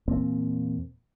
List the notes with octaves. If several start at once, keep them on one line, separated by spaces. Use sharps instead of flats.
E2 A#2 A#3 C4